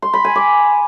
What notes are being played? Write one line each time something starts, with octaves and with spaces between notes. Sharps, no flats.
C6
B5
G#5
D6